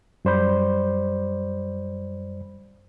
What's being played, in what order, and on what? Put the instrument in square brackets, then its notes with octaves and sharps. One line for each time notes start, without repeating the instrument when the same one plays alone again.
[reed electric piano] F#2 G3 C5 D5 B5 G6